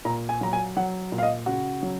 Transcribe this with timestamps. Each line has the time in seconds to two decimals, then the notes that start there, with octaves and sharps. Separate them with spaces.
0.05 A#2 A#5
0.29 G#5
0.41 F#3 A#5
0.53 G#5
0.77 F#3 F#5
1.12 A#2
1.18 F5
1.23 D#5
1.46 C#3 F#4
1.83 F#3